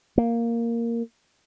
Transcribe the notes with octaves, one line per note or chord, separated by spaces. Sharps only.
A#3